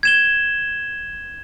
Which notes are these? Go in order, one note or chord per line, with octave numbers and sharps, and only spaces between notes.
G#6 E7 G7